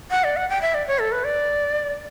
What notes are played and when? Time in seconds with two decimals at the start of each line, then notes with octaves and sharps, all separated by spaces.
0.11 F#5
0.24 D5
0.37 F#5
0.49 G5
0.62 E5
0.74 D5
0.87 C#5
0.99 A4
1.12 B4
1.24 D5